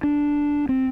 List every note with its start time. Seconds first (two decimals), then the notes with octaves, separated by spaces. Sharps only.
0.03 D4
0.69 C4